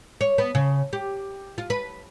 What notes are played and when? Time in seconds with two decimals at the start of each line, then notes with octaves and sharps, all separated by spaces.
0.21 C#5
0.38 B3
0.55 C#3
0.93 G4
1.58 F4
1.70 B4